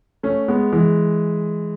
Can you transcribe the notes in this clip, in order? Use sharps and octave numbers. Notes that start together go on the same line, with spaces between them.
A3 C#4
G#3 B3
E3 G#3